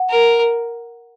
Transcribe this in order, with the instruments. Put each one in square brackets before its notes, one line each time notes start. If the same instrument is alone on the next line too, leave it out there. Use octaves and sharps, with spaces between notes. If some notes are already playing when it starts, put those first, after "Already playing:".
Already playing: [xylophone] F#5
[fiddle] A#4